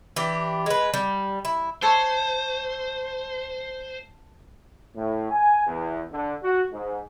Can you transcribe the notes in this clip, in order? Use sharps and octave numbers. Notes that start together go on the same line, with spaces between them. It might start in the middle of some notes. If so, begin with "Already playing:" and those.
E3 D4 G4
G#3 B4
G3
E4
A4 C5 C#5
A2
G#5
E2
D3
F#4
G#2